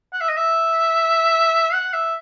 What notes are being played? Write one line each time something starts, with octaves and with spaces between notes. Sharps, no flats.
F#5
E5
D#5
E5
F#5
E5